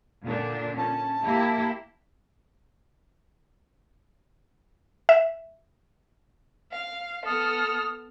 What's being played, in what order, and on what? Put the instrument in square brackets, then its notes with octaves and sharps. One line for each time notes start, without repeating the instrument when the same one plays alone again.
[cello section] A#2 D3 D4
[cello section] C#4 [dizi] A5
[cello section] A#3 E4 G4
[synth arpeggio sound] E5
[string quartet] F5
[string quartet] B3 A4 F6 [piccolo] D#6